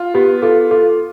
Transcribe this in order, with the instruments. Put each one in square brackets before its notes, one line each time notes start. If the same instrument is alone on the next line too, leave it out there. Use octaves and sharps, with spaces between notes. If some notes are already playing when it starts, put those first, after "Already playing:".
Already playing: [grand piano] F4
[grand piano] B3 [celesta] G4
[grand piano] F4 [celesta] A4
[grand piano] F4 [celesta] A4